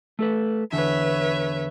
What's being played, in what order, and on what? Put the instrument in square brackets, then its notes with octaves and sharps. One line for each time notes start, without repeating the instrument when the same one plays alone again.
[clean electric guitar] A3 A4 B4
[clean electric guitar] E2 D3 [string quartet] B4 C#5 E5